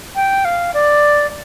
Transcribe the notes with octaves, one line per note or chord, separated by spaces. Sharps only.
G5
F5
D5